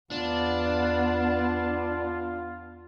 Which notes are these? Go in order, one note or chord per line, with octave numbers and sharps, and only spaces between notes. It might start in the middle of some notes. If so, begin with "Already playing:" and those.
E2 B3 D4 F4